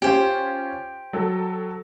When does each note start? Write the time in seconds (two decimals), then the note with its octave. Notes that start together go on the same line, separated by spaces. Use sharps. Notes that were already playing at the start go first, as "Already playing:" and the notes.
0.02 C#4 F4 G4 C5
1.13 F#3 A4